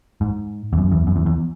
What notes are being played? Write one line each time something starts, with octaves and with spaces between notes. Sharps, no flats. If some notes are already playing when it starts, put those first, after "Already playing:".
G#2
E2
F#2
E2
F#2
E2
E2